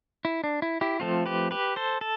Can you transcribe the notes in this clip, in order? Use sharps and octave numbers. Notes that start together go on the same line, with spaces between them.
E4
D4
E4
E4 G4
F3 A3 C4 F4 A4
G4 B4
G4 B4
A4 C5
A4